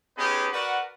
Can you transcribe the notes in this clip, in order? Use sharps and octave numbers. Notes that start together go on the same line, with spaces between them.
B3 C#4 D#4 G4 G#4 B4
F#4 A#4 B4 D5 F#5